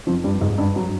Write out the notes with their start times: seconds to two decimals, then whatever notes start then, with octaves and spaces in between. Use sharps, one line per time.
0.07 F2 F3
0.24 G2 G3
0.41 G#2 G#3
0.58 G2 G3
0.76 F#3